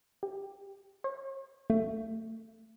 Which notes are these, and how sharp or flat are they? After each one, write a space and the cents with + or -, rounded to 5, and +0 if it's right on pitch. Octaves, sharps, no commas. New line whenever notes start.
G4 +20
C#5 -40
A3 +25